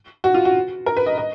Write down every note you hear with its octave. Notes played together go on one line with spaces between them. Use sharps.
F#4
F4
F#4
A#4
B4
D#5
D#5